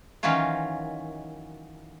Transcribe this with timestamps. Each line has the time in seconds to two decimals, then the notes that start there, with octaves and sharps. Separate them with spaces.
0.23 D#3 E3 F#3 C#4 F4